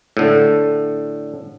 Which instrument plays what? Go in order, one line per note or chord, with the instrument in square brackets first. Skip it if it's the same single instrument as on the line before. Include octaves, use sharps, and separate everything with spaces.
[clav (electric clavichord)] A2 D3